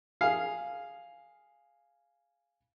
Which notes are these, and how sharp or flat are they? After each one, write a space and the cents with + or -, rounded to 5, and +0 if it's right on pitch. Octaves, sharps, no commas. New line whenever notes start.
G#4 +0 F5 +0